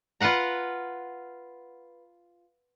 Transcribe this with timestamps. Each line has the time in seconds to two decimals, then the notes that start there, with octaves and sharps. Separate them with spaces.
0.20 F4 B4 F5 F#5 A#5